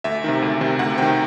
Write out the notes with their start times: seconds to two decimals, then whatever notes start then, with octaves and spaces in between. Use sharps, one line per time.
0.04 D2 E5
0.24 C3 D#3
0.42 D2
0.61 C3 D#3
0.79 D2 F#5
0.98 C3 D#3 G5